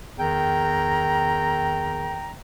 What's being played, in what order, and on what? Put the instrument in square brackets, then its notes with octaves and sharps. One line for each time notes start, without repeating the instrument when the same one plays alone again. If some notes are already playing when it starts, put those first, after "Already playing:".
[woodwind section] E2 D#3 G5 A#5